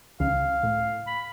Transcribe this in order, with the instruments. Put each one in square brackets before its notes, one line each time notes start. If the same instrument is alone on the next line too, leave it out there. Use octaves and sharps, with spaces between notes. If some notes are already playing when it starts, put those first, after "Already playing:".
[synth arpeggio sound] C#2 C#3 [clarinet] F5
[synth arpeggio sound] A2
[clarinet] B5